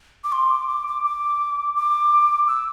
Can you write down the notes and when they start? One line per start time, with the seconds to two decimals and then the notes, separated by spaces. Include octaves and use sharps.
0.24 D6
0.32 C6
0.50 D6
0.68 D6
0.87 D6
1.04 D6
1.76 D6
2.48 E6